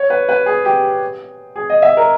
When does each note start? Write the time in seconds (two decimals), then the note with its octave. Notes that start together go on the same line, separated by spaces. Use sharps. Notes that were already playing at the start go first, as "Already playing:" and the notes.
Already playing: C#5
0.10 B4
0.29 B4
0.46 G#4
0.65 G4
1.56 G#4
1.70 D#5
1.82 E5
1.97 A#4